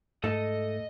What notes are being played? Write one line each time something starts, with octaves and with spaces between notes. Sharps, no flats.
G#2 A3 A4 D#5